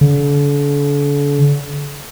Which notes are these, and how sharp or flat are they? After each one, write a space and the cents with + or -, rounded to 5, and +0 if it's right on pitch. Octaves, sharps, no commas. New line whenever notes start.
D3 -40